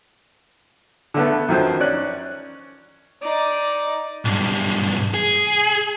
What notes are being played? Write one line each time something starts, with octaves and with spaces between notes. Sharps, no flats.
D3 A3 B3
F#2 D#3 F3 C5
C#4 D5 F#6
D#4 D5
B1 G2
G#4